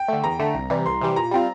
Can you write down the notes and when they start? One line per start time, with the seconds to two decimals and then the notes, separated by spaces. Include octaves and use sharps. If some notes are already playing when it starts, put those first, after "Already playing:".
Already playing: G5
0.08 D3 A3
0.24 E2 A#5
0.39 D3 A3
0.54 C2
0.70 C3 E3 G3
0.86 C2 C6
1.01 C3 E3 G3
1.16 A#2 A#5
1.31 G3 C4 F4